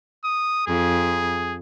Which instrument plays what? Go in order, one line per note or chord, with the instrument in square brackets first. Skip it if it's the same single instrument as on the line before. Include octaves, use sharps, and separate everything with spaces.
[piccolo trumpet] D#6
[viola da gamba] F2 [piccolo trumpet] G#4